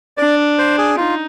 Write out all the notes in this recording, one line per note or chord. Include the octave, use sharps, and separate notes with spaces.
D4 D5
C5
G#4
D#4 F4